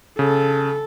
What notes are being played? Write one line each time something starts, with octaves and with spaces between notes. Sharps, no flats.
C#3 A4